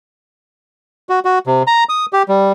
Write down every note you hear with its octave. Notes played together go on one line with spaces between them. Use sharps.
F#4
F#4
C3
A#5
D#6
G4
G3